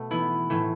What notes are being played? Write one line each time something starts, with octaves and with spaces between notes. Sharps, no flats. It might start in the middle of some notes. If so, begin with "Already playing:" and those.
Already playing: B2 A3
E3 B3 E4
A2 E3 A3